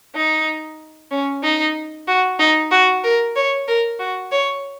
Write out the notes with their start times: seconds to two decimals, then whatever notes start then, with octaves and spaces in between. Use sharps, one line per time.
0.15 D#4
1.11 C#4
1.43 D#4
2.08 F#4
2.39 D#4
2.71 F#4
3.04 A#4
3.36 C#5
3.68 A#4
3.99 F#4
4.32 C#5